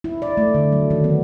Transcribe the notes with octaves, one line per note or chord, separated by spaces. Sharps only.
E4
D5
A3
D3
F#3
D#3
B3